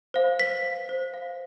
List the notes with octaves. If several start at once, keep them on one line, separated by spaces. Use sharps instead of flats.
C5 F5
B4 B6
F5
C5
F5